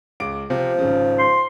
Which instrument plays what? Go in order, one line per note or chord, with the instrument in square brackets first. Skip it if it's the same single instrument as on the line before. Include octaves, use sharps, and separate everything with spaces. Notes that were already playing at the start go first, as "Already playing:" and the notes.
[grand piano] C#2 D6 D7
[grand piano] C3 [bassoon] F3
[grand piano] G#1 C#3
[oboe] C6